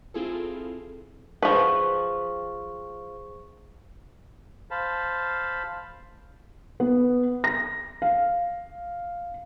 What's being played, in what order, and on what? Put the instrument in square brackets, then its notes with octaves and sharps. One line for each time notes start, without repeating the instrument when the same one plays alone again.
[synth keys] C4 E4 F4 G#4 A4
[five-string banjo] F3 B4 [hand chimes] G#4 C5 C#6
[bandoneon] C5 F5 A5 B5
[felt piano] B3
A#6
F5